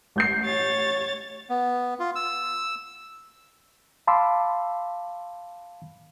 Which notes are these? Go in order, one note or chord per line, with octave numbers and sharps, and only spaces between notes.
A1 G6 C7
C#5 A6
B3
F4
E6
F5 A5 B5 C6 D6 E6